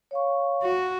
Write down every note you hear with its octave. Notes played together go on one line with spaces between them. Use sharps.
C#5 F5 C#6
F#4